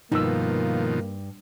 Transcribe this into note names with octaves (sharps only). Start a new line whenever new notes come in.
G2 B2 D#3 F3 A#3 D#4 E6